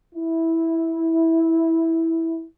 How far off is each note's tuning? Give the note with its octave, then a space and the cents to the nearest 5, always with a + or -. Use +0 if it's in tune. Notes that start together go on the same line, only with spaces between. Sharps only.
E4 -10